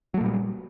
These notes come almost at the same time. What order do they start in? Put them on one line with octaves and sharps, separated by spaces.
F#3 A3 A#2 G3